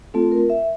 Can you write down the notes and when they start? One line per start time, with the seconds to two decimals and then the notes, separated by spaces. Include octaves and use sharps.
0.14 A3 C4 F4 A4
0.32 A#4
0.50 E5